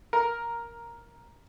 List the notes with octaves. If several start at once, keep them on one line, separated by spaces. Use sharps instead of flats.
A#4